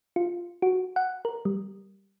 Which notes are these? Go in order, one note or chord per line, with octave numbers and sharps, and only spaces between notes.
F4
F#4
F#5
A#4
G3